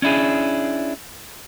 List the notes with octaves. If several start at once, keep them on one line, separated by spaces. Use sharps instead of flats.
C#4 D4 E4 G#4